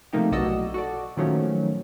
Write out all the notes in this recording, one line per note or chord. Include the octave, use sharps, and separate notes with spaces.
C3 F3 A3 A#3 D#4 G4
B1 A2 F#4 D5 D#5 E6
F#4 A4 D5
A#2 D#3 F3 F#3 A3 C#4